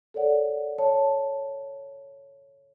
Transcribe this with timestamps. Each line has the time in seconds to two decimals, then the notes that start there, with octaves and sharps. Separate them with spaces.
0.14 A4 A#4 C#5 D5 F#5
0.78 C#5 A5